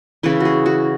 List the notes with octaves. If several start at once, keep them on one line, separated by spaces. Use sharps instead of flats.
C#3 E3 C#4 E4 B4
F#4 G#4
F#4